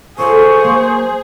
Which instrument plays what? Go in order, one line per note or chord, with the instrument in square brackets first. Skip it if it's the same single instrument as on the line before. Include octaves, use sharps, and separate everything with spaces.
[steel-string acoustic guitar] F4 A4 C#5 [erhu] G#4 [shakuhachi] C5 [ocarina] C#6
[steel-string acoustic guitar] F#3 A#3